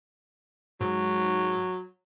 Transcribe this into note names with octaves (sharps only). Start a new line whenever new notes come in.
G#2 F#3